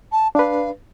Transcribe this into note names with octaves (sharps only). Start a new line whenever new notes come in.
A5
D4 B4 F5